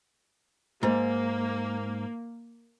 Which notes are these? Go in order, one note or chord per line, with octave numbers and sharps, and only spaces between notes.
G#2 A#3